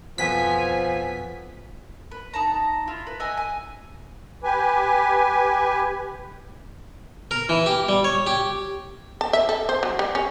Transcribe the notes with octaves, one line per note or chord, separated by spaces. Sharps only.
F2 B2 F3 G#5 B6
B4
D#4 A5 A#5
E4 F4
B4
D#5 E5 F#5 G#5
G#5
G4 B4 G#5
A#4
E3
G4
G3
C#5
G4
A5
E5
A4
C5
F#3
G3
C#4